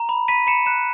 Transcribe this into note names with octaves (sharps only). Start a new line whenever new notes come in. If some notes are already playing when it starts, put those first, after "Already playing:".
Already playing: A#5
B5
B5 B6 D#7
B5 C#7 E7
F#6 C#7 E7